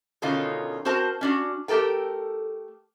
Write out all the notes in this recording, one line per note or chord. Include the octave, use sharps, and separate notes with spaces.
B2 D3 D#3 C#4 D#4 F4
C4 F#4 A#4 C5 A5
C#4 D4 F#4
A3 G4 A4 A#4 G5